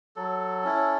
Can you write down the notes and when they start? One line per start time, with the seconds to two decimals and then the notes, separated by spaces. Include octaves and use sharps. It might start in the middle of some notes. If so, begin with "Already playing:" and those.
0.16 F#3 A4
0.64 C#4 E4